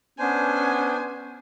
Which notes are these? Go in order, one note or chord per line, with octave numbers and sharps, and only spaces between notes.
B3 C#4 D4 C5 G#5